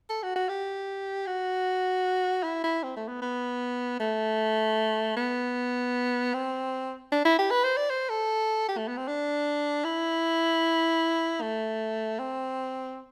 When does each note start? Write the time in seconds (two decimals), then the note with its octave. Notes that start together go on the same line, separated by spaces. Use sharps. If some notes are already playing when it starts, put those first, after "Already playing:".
0.10 A4
0.23 F#4
0.36 F#4
0.49 G4
1.27 F#4
2.43 E4
2.64 E4
2.83 C4
2.96 A3
3.08 B3
3.22 B3
4.00 A3
5.17 B3
6.34 C4
7.12 D4
7.25 E4
7.39 G4
7.51 B4
7.64 C5
7.77 D5
7.90 C5
8.09 A4
8.68 G4
8.77 A3
8.88 B3
8.97 C4
9.07 D4
9.84 E4
11.42 A3
12.19 C4